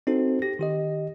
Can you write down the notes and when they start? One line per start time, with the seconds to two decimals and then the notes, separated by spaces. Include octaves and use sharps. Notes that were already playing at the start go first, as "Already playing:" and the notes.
0.07 C4 D#4 F#4 A4 C5
0.42 G4 A#6
0.59 D#3 G4 D#5